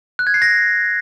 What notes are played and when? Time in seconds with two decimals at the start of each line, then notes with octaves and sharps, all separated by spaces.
0.19 F#6
0.27 G#6
0.34 C7
0.42 A#6